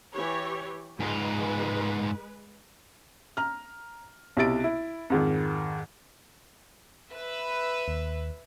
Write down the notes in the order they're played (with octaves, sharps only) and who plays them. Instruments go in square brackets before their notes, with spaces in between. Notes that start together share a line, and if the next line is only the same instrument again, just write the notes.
[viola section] E3 G4 C#5
[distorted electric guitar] G#2 F4 [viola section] G#3 B4
[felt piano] A#5 F6
B1 C3 E4 E6 A6 D7
E4
F2 G#2 D#3
[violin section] B4 E5
[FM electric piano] D#2